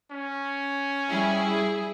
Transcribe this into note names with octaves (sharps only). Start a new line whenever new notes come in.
C#4
G3 E4 G#4